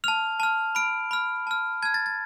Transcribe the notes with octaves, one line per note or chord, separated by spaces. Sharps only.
A5 F6 F7
A5 F6
B5 F6 D7
B5 F6
A5 F6
A5 F6 G#6
A6
A6